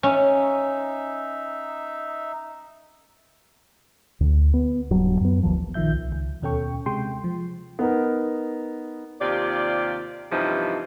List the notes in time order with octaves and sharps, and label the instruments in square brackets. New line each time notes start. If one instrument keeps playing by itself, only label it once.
[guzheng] C#4 [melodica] D#4 E5
[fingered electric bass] D2
B3
D1 G2 F#3
F#2 B3
G#1 D#2 D#3 F3
[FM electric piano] A#1 D#3 F3 E5 G6
C2
C#2
D#2 B2 C#4 A4 G5 C#6
C3 G#3 G5 C6
F3
[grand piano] B3 D#4 A#4
[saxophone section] D#2 C3 F4 G4 D5
G2 C3 E3 F3 G3 D#4